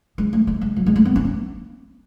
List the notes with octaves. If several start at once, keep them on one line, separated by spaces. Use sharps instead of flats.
G#3
A3
A3
G#3
F#3
G#3
A3
B3
C#4
B3